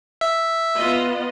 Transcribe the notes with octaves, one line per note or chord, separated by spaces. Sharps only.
E5
B3 F4 D#5